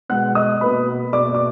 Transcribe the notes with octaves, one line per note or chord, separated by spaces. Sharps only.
B2 G#3 B3 F#5 F#6
D#5 D#6
B2 A#3 B4 B5
B2 A#3 D5 D6
D6